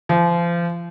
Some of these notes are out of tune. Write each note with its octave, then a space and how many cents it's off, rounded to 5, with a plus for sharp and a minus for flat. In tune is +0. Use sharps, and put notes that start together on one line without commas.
F3 -30